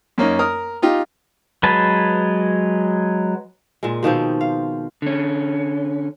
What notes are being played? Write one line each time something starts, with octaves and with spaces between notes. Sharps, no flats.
F#2 A#3 C#4 D#4
A#4 D#6 F6
D#4 F4 G4
F#3 G#3 B4 A5
A#2 G#3
B2 D#3 F3 C4
F5
D3 C#4